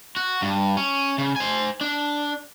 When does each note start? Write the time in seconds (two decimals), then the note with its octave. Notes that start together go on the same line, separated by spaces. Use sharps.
0.16 F#4
0.42 G2
0.77 C#4
1.18 C#3
1.36 C5 G#5
1.81 D4